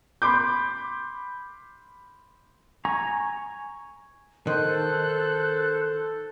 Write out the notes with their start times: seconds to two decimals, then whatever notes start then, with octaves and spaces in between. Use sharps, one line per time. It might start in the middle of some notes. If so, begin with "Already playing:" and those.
0.22 B5 C6 D6 G6
2.85 G#5 A#5 C#6
4.47 D#3 A4 C5 F#6